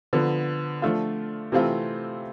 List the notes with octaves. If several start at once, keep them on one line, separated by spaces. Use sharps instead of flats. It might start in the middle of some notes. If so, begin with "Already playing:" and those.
D3 F3 B3
F3 A3 D4 F4
C3 E3 A3 C4 F4